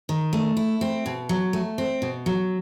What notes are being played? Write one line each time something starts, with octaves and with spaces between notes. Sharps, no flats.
D#3
A3
E4
C4
B2
F#3
A3
C4
B2
F#3